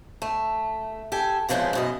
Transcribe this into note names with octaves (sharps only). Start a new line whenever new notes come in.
A3
G4 A4 G#5
F2 C#3 E3 F3 G#3 D#4
F#2 B2 D#5